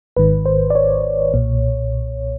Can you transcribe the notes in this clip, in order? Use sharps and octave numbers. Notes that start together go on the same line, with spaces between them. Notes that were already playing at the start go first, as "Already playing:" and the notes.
G#1 G#2 D#3 B4
C5
D5
C#5
B1 A#2